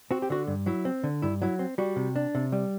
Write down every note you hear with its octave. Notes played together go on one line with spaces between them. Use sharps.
C4 F#4
G4
D3 F#4
G2
F#3 E4
C4
D3
G2 E4
F#3 E4
C4
G3 F#4
C3
D4
C3
G3